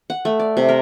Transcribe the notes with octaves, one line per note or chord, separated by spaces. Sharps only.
F#5
A3
D5
C3
A#4